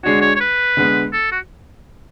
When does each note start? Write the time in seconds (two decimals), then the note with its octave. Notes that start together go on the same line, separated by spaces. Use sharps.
0.03 D3 G#3 D4 F#4 C#5
0.22 C#5
0.35 C#5
0.41 B4
0.77 D3 G#3 B3
1.13 A4
1.31 F#4